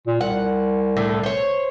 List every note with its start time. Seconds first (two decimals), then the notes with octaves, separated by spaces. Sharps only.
0.07 A#2
0.21 C2 F#5
0.97 A2 D3 A3
1.23 C5 C#5